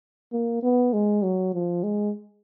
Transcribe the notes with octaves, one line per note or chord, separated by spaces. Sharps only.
A#3
B3
G#3
F#3
F3
G#3